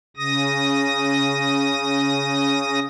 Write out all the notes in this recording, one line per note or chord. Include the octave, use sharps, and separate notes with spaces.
C#3 D#6 A#6